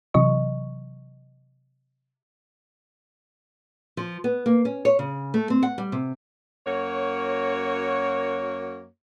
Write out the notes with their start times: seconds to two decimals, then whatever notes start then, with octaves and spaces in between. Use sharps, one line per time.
0.14 C3 E3 F#3 D#5 C#6
3.97 F3
4.24 B3
4.46 A#3
4.65 C#4
4.85 C#5
4.99 C#3
5.34 A3
5.50 C4
5.63 F#5
5.78 G3
5.92 C3
6.66 F#2 A#3 F#4 C#5